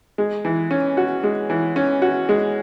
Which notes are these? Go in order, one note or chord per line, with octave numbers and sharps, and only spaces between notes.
G#3
E3
C#4
F#4
G#3
E3
C#4
F#4
G#3